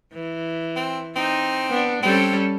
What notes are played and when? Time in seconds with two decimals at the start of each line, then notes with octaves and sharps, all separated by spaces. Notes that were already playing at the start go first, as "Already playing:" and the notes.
0.14 E3
0.76 C4
1.16 C4 D#4
1.70 B3 D4
2.03 G3 C4 C#4 A4